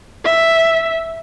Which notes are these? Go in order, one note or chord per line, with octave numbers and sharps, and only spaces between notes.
E5